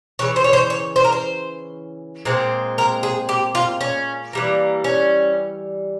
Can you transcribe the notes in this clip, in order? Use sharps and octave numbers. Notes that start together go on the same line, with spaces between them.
C#3 E3 C#5
C5
C#5
C5
C#5
C5
A#4
C5
A#2 G#3 C4
A#4
G#4
G4
F4
C#4
E3 G3 A#3
C#4